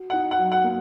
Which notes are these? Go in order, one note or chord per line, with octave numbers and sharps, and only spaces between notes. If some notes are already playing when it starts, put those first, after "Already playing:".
Already playing: F#4
D#4 F#5
F#5
F#3
F#5
A#3